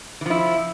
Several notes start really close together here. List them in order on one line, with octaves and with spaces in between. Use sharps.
E3 F3 E4